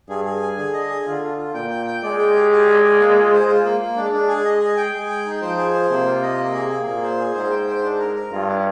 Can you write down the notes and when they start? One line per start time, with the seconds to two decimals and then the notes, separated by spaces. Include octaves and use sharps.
0.09 G2 G#4
0.25 G#4
0.42 G#5
0.57 D3 G#4
0.74 D#5
0.89 G#4
1.06 D3 F4
1.22 F4
1.38 F4
1.54 A#2 G5
1.70 G5
1.86 G5
2.03 G#3 D5
2.19 G5
2.34 G4
2.51 G4
2.67 D5
2.84 D5
3.00 A#3
3.16 F4
3.32 C5
3.48 F4
3.64 A#3
3.81 A#3
3.97 G#3 D4
4.12 D4
4.28 G#4
4.45 D#5
4.60 G#4
4.77 G5
4.93 G#3 G#4
5.09 G5
5.26 D#4
5.41 F3 C5
5.57 G#4
5.74 C5
5.90 C3 A#3
6.06 F4
6.22 D#5
6.38 A#3
6.54 G#4
6.71 A#3
6.87 A#2 G#4
7.03 C5
7.18 G#4
7.34 G#2 C5
7.51 G5
7.67 C5
7.83 D4
7.99 A#4
8.15 A#4
8.32 G2 F4
8.47 D4